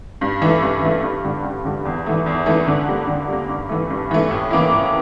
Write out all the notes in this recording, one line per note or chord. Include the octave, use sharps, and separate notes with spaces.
G2
E3 A3
G2
E3 A3
G2
D3 G3
G2
D3 G3
E2
E3 A3
E2
E3 A3
D3
G3 A#3
D3
G3 A#3
G2
E3 A3
G2
E3 A3
A2
E3 A#3 E4
A2